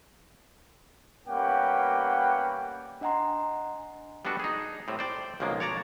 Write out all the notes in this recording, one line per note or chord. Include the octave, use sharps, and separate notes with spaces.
G3 A#3 B3 C#4 F#5 G5
D4 D#5 F#5 G#5 A#5 C6
G3 B3 D4 F#4 A4
D#4 G#4
A2 G3 C4
C5 D5 G5
B1 C#3 F3 G#3 A#3
C#5 D5 A5 A#5